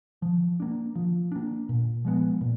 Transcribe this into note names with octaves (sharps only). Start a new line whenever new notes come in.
F3
A#3 D4
F3
A#3 D4
A#2
F3 G#3 B3
A#2